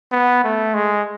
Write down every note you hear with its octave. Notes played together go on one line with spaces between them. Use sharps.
B3
A3
G#3